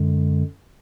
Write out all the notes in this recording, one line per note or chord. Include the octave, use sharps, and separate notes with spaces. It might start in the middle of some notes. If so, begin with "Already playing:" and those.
Already playing: F#2 D3 G#3